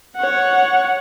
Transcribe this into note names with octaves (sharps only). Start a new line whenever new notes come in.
C#5 F#5